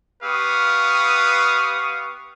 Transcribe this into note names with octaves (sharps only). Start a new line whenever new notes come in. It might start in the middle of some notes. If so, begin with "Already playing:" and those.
B3 G4 B4 F5 C#6 D#6